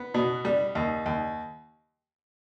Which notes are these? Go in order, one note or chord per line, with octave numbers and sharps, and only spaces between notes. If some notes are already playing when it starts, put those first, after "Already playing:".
Already playing: B3
B2
G3
D#2
D#2